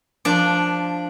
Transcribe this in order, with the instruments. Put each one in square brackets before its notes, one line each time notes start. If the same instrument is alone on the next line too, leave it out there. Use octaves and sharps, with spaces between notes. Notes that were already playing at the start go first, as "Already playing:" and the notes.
[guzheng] F3 D4 D5